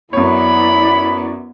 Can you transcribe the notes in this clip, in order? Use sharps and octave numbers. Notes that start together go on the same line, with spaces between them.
F#2 B3 E4 C#5 D5 B5